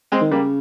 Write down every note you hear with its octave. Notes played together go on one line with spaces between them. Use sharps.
G#3 C4
D#3
C#3 G3 A#3